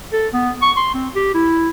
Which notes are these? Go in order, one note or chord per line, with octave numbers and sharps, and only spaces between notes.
A4
B3
C#6
C6
C4
G4
E4